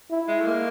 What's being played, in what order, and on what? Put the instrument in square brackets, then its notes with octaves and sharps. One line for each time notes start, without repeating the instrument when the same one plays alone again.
[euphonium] E4
[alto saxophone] G#3
A3
A#3